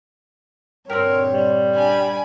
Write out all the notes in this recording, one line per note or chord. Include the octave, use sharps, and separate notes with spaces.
G2 A#2 D3 C4 D#4 G4 A#4 C#5
G3
D4 G#5 B5